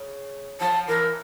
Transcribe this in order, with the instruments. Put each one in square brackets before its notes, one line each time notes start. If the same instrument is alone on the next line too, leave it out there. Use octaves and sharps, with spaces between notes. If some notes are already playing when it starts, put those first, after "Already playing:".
Already playing: [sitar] C#3
[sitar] F3 [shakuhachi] A5
[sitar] E3 [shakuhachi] A#4